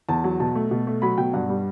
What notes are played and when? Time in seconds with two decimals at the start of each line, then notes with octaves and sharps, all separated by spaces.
0.09 E2 A5
0.24 F#3
0.40 B2 A5
0.56 A3
0.71 B2
0.87 A3
1.02 F#3 B5
1.18 B2 G5
1.34 G2 F#5
1.49 G3